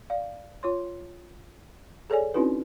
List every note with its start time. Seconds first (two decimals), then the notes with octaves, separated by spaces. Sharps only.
0.10 D5 F5
0.63 F4 C#5 C6
2.10 G#4 A4 C#5 D5 G#5
2.34 C4 C#4 D#4 E4 F#4 B4